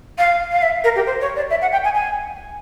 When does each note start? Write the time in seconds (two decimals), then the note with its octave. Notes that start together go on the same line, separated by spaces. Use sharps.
0.18 F5
0.52 F5
0.62 E5
0.84 A#4
0.96 G4
1.07 C5
1.21 C#5
1.36 D5
1.50 E5
1.62 F#5
1.72 G5
1.84 G#5
1.95 G#5